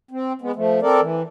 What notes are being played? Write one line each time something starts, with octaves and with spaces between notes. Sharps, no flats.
C4
G#3 B3
F3 A3
C4 A4 A#4 D5
E3